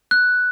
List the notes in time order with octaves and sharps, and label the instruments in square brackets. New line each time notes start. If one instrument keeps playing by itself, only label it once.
[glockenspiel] F#6